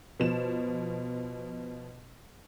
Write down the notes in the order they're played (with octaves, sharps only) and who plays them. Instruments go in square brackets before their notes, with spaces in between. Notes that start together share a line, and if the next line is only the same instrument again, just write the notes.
[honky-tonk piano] B2 F3 E7